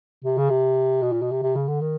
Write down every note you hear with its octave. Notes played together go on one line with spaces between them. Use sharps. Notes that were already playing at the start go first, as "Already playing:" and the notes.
C3
C#3
C3
B2
A#2
B2
C3
C3
C#3
D3
D#3